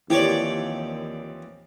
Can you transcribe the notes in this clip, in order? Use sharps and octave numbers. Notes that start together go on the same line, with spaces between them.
D#2 E3 F3 C4 E4 G4 C#5 D5